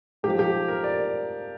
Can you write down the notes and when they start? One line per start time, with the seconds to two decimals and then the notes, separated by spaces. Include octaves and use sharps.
0.23 G#2 G4
0.27 F3
0.39 G4
0.68 A#4
0.84 D5